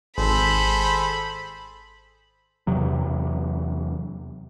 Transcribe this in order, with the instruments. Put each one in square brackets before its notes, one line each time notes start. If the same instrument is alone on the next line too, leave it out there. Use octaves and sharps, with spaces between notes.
[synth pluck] G#1 [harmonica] G#4 A4 C5 [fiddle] B5
[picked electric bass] E2 C3 F#3